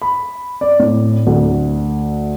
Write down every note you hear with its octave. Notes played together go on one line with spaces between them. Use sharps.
B5
D5
A2
D2